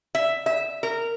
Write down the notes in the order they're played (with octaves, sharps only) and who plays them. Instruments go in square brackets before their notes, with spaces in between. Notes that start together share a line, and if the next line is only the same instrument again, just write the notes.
[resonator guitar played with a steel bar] E5
E5
A#4